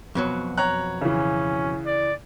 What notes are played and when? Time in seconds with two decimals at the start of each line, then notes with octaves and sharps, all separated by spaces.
0.15 F2 B2 F#3
0.57 C#5 A#5 F#6
1.01 C#3 E3 C#4
1.86 D5